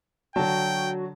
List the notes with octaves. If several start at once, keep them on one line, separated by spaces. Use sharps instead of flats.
D3 F#3 F#4 G5 A5